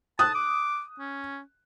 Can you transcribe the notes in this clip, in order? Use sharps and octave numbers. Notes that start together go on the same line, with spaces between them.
A5 D#6 F#6
D6
C#4